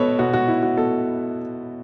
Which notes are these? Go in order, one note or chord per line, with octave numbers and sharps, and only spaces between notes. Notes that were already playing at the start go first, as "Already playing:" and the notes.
Already playing: B2 A4 B4 C#5
B2 F#4
F#4
E4
F#4
B2 A4